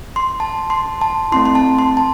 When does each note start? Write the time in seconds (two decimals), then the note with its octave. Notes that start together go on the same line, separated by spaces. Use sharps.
0.16 C6
0.40 A5
0.70 C6
1.01 A5
1.32 A3 C4 E4 C6
1.45 C6
1.55 A5
1.78 C6
1.97 A5